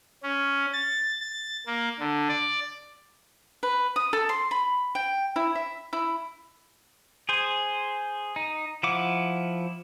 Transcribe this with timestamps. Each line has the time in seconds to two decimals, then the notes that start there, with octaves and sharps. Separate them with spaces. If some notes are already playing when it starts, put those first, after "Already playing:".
0.23 C#4
0.73 A6
1.21 A6
1.67 A#3
1.99 D3
2.29 D5
3.63 B4
3.96 D#6
4.13 A4
4.29 C6
4.51 B5
4.95 G5
5.36 E4
5.55 E5
5.93 E4
7.29 G#4 C5
8.36 D#4
8.83 F3 E4 F#5 D6